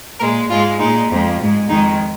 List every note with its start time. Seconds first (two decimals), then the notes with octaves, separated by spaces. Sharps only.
0.20 A#2 G#3 A#4
0.50 G#2 G#3 F4
0.80 A#2 G#3 D#4
1.10 F2 F3 G#3
1.40 G#2 G#3
1.69 F2 D#3 G#3 D#4